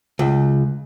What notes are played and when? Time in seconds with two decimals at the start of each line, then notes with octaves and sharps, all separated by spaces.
0.19 C#2